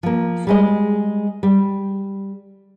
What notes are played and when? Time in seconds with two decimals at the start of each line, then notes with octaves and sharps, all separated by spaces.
0.03 F3 A#3
0.47 G3 G#3 D#5
1.43 G3